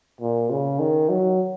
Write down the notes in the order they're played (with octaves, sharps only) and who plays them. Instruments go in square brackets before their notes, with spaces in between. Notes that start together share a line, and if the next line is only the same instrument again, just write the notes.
[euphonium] A#2
C#3
D#3
F#3